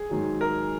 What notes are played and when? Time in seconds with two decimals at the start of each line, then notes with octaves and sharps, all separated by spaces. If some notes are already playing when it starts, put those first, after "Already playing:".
Already playing: G#4
0.10 G#2 D#3 F#3
0.41 A#4